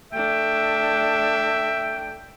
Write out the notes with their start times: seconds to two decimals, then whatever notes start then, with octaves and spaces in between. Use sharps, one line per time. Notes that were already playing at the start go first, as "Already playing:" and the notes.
0.13 A3 D4 E5 G5